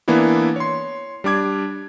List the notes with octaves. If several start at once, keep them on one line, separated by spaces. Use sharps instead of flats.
E3 A#3 B3 D4 E4
C#5 C6
G3 D4 D6 G#6